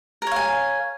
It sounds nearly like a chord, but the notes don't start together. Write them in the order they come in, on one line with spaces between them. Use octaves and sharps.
A#4 C#5 F5 G#5